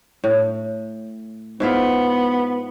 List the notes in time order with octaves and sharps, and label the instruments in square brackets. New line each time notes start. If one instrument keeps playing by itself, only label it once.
[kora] A2
[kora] G#2 E4 F4 [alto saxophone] B3